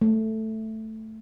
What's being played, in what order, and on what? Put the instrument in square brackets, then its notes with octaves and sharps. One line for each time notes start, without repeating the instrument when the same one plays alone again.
[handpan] A3